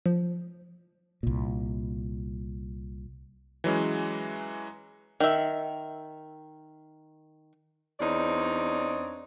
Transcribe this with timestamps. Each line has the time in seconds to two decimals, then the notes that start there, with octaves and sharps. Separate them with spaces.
0.06 F3
1.23 C2 A#2
3.64 E3 F#3 G#3 C#4
5.20 D#3 E5
8.00 E2 C4 D4 D#4 C#5 D5